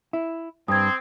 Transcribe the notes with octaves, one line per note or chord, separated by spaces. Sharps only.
E4
G2 C4 D#6 G#6